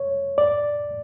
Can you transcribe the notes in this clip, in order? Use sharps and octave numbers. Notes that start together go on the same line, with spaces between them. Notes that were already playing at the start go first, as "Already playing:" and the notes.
Already playing: C#5
D5